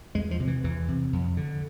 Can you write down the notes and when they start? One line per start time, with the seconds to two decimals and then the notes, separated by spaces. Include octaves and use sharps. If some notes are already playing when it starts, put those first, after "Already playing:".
0.15 E2 G#3
0.31 F3
0.40 C3
0.48 E3
0.64 E2 E3
0.88 C3
1.13 F2
1.37 D3